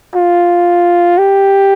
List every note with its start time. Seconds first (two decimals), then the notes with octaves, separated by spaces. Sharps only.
0.15 F4
1.18 G4